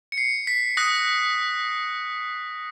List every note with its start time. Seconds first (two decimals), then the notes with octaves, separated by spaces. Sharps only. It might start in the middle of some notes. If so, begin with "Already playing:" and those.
0.12 C#7
0.17 C7
0.47 B6
0.77 D#6 F#6 A#6